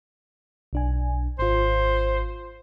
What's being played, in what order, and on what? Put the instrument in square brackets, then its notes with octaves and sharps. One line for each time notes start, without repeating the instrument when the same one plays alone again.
[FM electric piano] B1 D4 G#5
[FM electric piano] G#1 F4 [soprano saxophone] C5